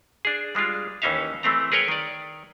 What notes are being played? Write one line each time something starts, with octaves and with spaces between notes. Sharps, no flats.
D4 G#4
G3 G#3 D4 F4
D#2 E3 C#4 D#4 E5 F5
E3 A3 C4 A#5
G#4 A#4 B4 C#5 G5
D#3 D5